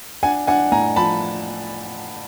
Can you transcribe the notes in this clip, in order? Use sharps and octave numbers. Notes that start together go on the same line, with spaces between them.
D4 F#5 G#5
D4 F#5 G#5
A2 G#5 A#5
F3 A5 B5